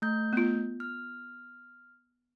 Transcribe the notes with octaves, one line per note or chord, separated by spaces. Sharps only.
A3 G6
B3 F4
F6